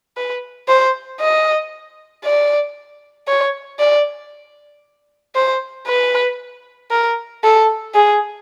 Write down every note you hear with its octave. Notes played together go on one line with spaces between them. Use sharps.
B4
C5
D#5
D5
C#5
D5
C5
B4
A#4
A4
G#4